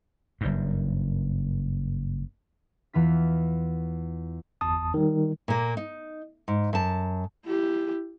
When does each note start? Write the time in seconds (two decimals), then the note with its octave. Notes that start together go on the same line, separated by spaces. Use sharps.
0.41 F#1 G2
2.93 E2 E3 F4 B6
4.61 G1 E2 A5 D#6
4.94 D#3 G3
5.48 A#2 A#3
5.77 D#4
6.48 G#2
6.73 F#2 A5
7.46 E4 G4